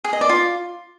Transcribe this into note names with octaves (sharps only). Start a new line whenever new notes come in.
G#4
D#5
D5
F4